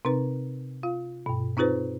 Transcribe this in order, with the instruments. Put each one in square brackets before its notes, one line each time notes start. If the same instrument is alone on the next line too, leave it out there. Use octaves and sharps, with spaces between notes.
[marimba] C3 C4 D#4 B4
F4 F5
G2 B2
C4 D#4 F4 G#4 B4 C5